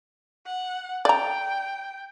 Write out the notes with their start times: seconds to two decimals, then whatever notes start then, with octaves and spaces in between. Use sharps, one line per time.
0.46 F#5
1.05 D5 G5 A#5